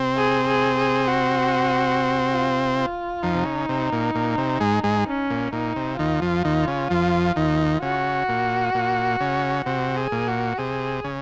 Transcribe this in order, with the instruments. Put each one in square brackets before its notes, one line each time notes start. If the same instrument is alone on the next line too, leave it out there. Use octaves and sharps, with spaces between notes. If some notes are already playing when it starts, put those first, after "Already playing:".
Already playing: [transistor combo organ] C3 C4
[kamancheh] G#4
G#4
G#4
F#4
F4
F4
[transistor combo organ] F2 F3 [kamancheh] D#4
[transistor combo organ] C3
C#3
C3
A#2
A#2
C3
G#2 G#3
G#2 G#3
[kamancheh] C#4
[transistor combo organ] A#2
[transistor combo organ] A#2 [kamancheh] D#4
[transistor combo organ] C3
[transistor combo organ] D#2 D#3 [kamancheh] F4
[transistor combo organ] F2 F3
D#2 D#3
C#3
F2 F3
D#2 D#3
[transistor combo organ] C#3 [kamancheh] F#4
[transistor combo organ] A#2
A#2
C#3
[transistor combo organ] C3 [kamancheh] F#4
[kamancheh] G#4
[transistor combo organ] A#2
[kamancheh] F#4
[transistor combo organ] C3 [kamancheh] G#4
[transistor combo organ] C#3